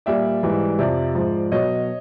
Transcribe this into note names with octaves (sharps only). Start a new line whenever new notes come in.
A#2 G3 D5 E5
G#2 E3 G3
F2 C3 F3 D5 E5
G#2 F3
B2 F#3 C#5 D#5